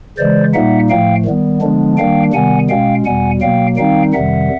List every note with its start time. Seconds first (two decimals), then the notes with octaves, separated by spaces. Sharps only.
0.18 C#3 E3 G#3 C5 D5
0.54 A#2 G3 A#3 D#4 E5 F#5
0.90 A2 F3 A3 F5 G5
1.26 D#3 G3 B3
1.62 D3 F3 G#3 B3 D4
1.98 D#3 G3 A#3 D4 F5 G5
2.34 C3 D#3 G3 B3 F#5 G#5
2.69 B2 G#3 C#4 F5 G5
3.06 E2 B2 G3 F#5 G#5
3.42 B2 F#3 A#3 F5 G5
3.77 D#3 G3 C4 D#4 F5 G5
4.13 F2 C3 D#3 G3 E5 F#5